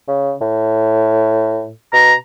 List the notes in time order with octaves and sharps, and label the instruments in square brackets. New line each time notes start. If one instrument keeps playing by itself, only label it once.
[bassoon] C#3
A2
[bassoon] B2 [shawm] A#5